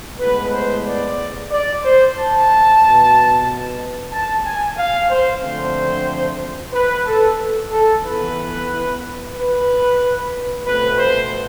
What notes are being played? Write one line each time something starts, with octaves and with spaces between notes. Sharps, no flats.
A2 G#3 B3 B4
C5
D5
D5
C5
A5
B2 B3
A5
G#5
F5
C5
D3 F3 A3 C4 C5
B4
A4
A4
E3 B3 B4
B4
B2 A3 C4 B4
C5